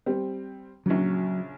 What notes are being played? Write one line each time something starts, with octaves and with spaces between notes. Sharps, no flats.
G3 C4
A#1 C#3 F#3